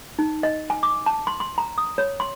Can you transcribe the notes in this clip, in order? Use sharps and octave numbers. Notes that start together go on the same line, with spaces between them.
D#4
D#5
G#5
D6
A5
C6
C6
A#5
D#6
C#5
C6